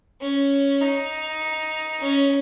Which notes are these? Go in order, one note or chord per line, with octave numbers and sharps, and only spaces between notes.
C#4
D#4
C#4